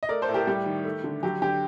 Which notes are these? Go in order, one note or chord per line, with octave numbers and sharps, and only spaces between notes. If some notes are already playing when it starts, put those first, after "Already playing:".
D#5
A3 A#4 D5
A4 C5
A2
G4 A#4
G3 G4
D#3
A3
D3
F#3 G4
D3 G4